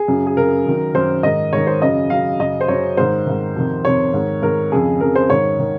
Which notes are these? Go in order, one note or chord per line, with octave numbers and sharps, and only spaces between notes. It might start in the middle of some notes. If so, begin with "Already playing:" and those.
Already playing: G#4
F#2 C#3
G#4
F#2 C#3 A#4
F#2 D#3
F#2 D#3 C5
G#2 D#3 D#5
G#2 D#3 C#5
C5
F#2 C#3 D#5
F#2 C#3 F5
F#2 C#3 D#5
C5
F#2 C#3 C#5
G#2 D#3 C5
G#2 D#3
F2 C3 D#3
F2 C3 D#3 C#5
G#2 D#3
G#2 D#3 A#4
F2 C#3 G#4
F2 C#3 A#4
C5
G#2 D#3 C#5
D#3